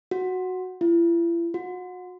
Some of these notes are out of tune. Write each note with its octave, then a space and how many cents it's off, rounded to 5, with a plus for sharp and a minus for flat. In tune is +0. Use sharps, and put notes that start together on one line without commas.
F#4 -5
E4 +45
F#4 -30